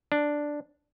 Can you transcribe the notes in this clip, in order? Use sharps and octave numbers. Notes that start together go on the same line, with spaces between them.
D4